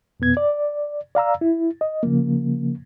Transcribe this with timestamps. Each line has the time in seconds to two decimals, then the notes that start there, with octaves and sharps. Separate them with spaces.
0.20 F2 B2 B3 G#6
0.37 D5
1.15 D5 F5 A#5 E6
1.41 E4
1.81 D#5
2.03 C#3 F3 A#3